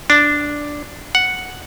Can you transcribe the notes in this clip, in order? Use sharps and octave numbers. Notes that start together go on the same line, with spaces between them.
D4
F#5